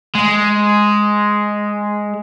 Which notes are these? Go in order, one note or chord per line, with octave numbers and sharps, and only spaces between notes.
G#3